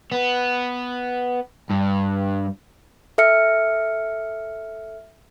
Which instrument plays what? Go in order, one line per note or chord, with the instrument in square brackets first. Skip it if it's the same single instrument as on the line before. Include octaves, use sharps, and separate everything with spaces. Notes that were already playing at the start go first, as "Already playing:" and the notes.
[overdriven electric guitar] B3
G2
[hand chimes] A4 E5 F6 C#7